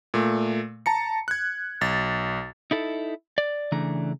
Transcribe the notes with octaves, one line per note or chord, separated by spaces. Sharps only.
A#2 A3
A5 A#5 C#7
F#6 G#6
B1 A6
D#4 E4 A4
D5
C#3 E3 A3 D4 A#5